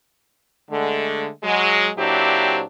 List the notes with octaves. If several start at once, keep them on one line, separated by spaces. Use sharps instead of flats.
D3 G#3 A3
F#3 G#3
A#2 F#3 C4 D4 E4 G4